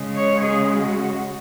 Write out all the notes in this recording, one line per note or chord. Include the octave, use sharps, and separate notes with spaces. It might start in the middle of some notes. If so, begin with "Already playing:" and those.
Already playing: C#3 G#3
C#5
G#4
F#4